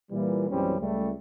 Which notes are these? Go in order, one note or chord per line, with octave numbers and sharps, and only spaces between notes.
A#2 E3 G3
A#1 F#2 E3 G3 C4 C#4
C#2 G3 A3